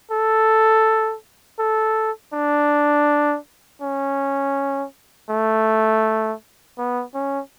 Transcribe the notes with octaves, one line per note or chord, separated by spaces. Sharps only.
A4
A4
D4
C#4
A3
B3
C#4